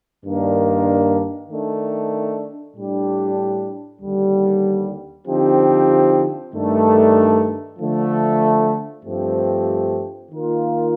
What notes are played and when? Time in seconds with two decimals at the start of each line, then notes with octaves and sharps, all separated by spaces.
0.24 G2 D#3 A#3 D4
1.48 D#3 A3 D4
2.74 A2 G3 D4 G4
4.00 D#2 D3 G3
5.27 D3 F3 C4 D#4 G4
6.52 G2 D#3 A3 D4
7.78 D3 F3 A3
9.04 G2 F3 A3 C4 G4
10.30 D#3 A#3 F4 A#4